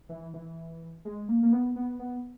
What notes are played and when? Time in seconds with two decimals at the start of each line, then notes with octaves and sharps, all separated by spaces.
0.09 E3
0.34 E3
1.05 G#3
1.28 A#3
1.43 A#3
1.53 B3
1.76 B3
1.99 B3